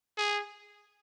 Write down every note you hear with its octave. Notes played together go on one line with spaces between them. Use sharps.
G#4